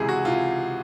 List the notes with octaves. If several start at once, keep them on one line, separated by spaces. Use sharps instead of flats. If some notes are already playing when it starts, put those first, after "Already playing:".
Already playing: C#2 C3 E3 G#4
F#4
C3 E3 F4